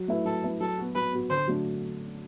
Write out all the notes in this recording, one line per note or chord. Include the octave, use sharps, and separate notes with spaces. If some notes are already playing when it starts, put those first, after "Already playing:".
Already playing: F#3
A3 E4 B4
F#3 A4
A3 E4 B4
F#3 A4
B3 F#4
F#3 B4
B3 F#4
D3 C5
F#3 A3 D4